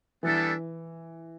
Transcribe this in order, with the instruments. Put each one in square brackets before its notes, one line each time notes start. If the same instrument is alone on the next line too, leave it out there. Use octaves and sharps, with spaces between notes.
[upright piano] E3 [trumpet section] G3 B3 D4 A4 E5